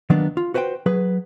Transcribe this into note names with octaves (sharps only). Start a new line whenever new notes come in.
D#3 F#3 A#3 B3 D4
F4
F#4 B4 C5 E5 G5
F#3 G#4 B4